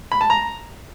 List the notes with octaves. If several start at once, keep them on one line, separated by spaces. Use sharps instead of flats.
B5
A5
A#5